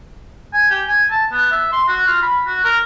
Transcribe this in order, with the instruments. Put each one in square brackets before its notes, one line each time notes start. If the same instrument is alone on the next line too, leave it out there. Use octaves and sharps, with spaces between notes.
[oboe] G#5
G4
G#5
A5
B3
E5
C6
F#4
F4
B5
F#4
A#4